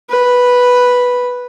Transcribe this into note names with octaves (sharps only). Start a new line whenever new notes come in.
B4